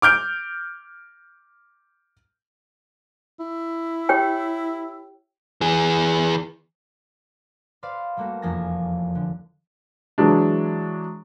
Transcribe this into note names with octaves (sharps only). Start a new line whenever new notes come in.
D6 F6 G6 D7
E4
G4 C#5 G5
E3 G#4
B4 C5 D5 F5 C6
G3 A3 A#3 F#4
F1 E2 F3 A#3 G#5 A#6
D3
E3 F#3 G#3 D4